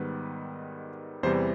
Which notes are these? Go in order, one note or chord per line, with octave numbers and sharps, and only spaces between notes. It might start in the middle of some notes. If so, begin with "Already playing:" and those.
Already playing: G#2 D#3 G3 B3 B4
E2 C3 E3 G3 C5